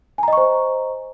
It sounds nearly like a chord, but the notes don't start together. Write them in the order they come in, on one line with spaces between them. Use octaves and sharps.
G#5 A#5 D#5 C#6 C5